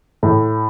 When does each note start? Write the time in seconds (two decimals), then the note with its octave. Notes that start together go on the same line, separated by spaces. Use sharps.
0.23 A2